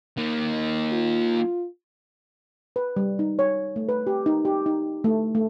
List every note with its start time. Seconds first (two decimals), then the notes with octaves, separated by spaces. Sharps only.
0.17 A#3 D#4
0.92 F4
2.76 B4
2.97 G3
3.19 D#4
3.39 C#5
3.76 A3
3.89 B4
4.07 G4
4.26 D#4
4.45 G4
4.66 D#4
5.04 A3
5.35 A3